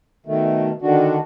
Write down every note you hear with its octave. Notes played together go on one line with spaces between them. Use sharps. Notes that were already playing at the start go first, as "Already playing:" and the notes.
B2 D#3 A3
D3 D#3 D4 F#4